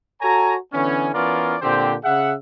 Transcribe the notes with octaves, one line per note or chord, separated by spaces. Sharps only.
F#4 A4 C#5 G#5 A#5
D3 E3 B3 C#4
E3 B3 C#4 F4 A#4 D5
A#2 D3 C4 G4 C5 G5
C#3 G#4 E5 F#5